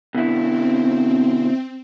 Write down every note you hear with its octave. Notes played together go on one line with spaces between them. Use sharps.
B2 D3 C4 E4